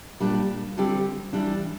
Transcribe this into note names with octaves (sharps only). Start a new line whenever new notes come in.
A#2 G3 D4
D3 G3 C4 G4
E3 G3 D4